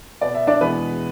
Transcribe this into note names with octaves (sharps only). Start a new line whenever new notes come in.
B2 B3 D5
E5
D4 D5
E2 B2 G#3 B3 B4